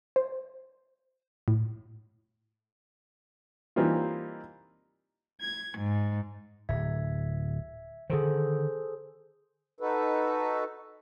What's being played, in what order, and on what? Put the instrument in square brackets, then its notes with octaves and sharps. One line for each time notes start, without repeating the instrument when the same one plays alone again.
[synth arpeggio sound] C5
A2
[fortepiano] E3 G3 A#3 C4 D#4 F4
[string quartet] G#6
G#2
[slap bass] D1 [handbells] E5 G#6
[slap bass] D3 D#3 [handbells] G#4 A4 C5
[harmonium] D#4 F#4 A4 B4